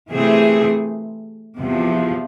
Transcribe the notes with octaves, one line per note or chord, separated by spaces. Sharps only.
C3 E3 A3 C4 G#4
E2 C3 F3